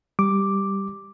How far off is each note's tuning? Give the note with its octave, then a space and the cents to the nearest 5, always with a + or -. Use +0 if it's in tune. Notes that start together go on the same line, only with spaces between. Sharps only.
G3 +0 D6 +0